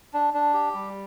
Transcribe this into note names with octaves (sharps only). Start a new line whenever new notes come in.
D4
D4
G4
G3